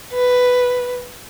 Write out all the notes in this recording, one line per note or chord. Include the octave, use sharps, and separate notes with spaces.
B4